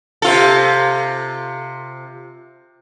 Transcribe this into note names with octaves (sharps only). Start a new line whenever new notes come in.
C3 F4 A4